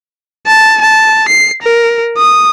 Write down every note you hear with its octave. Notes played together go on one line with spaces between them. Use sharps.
A5
A5
C7
A#4
D#6